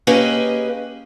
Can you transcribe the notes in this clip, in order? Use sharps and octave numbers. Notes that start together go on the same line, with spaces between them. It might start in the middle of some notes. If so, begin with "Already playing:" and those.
A#3 C#4 G4 G#4 B4 D#5